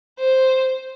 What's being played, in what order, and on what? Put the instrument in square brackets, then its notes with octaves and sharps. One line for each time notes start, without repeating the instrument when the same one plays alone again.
[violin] C5